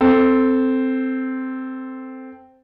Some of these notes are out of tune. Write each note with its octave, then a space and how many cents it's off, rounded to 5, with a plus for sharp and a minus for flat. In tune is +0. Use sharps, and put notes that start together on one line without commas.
C4 -5 A4 +5